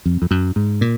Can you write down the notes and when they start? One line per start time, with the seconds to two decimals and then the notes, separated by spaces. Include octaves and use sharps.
0.06 F2
0.22 F2
0.31 F#2
0.56 G#2
0.81 A#2